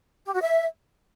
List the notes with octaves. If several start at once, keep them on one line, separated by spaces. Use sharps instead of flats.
G4
F#4
E5